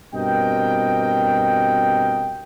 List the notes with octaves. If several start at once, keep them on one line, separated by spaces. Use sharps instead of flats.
G2 B2 C4 A#4 D#5 G5